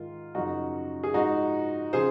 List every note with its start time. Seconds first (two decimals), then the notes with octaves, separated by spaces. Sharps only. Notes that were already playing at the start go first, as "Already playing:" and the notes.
Already playing: G#2 D#3 F4
0.35 F#2 C#3 F3 D#4 F#4
1.04 G#4
1.14 G#2 F3 D#4 F#4
1.93 C#3 F3 G#4 C5